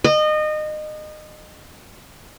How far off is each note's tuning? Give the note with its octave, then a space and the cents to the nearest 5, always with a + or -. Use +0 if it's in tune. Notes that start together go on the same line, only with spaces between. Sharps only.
D#5 -25